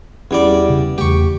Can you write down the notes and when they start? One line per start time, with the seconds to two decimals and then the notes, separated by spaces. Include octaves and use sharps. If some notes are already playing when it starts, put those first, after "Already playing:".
0.31 E2 G3 C#4 D5
0.70 C#3
0.98 E2 A3 G4 C#6